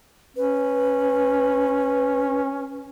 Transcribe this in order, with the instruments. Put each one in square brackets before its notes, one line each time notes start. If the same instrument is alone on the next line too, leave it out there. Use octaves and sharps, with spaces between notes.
[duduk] C#4 [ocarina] B4